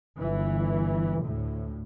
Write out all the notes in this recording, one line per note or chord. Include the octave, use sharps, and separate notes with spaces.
G1 E3
D2 A2